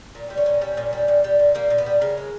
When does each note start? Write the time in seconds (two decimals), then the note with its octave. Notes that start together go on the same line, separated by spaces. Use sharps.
0.15 A#2
0.30 G3
0.37 C#4
0.46 A#2
0.61 G3
0.77 A#2
0.93 G3
1.08 A#2
1.24 G3
1.39 A#2
1.55 G3 A#3
1.70 A#2
1.78 B3
1.86 G3
2.01 C#3 A#4
2.17 G#3